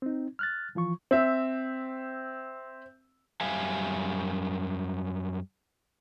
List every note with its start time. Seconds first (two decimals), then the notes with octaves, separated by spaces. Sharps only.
0.02 C4 D#4
0.39 F6 F#6 A6
0.75 E3 F3 F4 C#6
1.11 C4 E5
3.41 F#2 G3 E5 F5 G#5